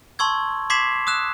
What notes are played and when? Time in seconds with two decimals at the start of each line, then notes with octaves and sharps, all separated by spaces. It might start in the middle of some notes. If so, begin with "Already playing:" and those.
0.19 A5 C6 C#6 E6 G#6
0.70 C6 D6 G#6 B6 C7 E7
1.07 D#6 E6 F#6 E7